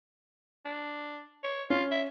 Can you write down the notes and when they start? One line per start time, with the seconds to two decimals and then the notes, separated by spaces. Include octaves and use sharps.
0.65 D4
1.43 C#5
1.70 C#4 F4
1.91 E5